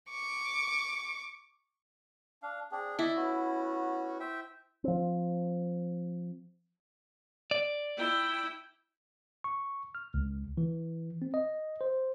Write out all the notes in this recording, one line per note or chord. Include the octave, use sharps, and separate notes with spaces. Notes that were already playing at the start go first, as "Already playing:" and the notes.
C#6 D6
D4 F5
C4 D4 G#4
E4 D5 D#5
B3 C#4 F#4
C5 E5 G5
F3 C4
D5
E4 G5
C#6
F6
C#2
E3
C4
D#5
C5